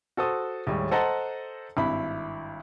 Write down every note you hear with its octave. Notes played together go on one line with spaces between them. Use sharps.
F#4 A4 C5 D#6
D#2 A2 G3 G#3
A4 C5 D#5 F#5 A5 A#5
G#1 G2 E4 B5